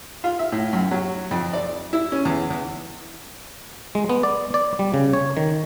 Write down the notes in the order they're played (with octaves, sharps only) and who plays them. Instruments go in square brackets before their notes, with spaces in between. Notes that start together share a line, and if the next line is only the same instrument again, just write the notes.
[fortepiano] F4
E5
A2
F#2
F#3
F2
D5
E4
C#4
E2
E2
[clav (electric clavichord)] G#3
B3
D5
D5
G3
C#3
C#5
D#3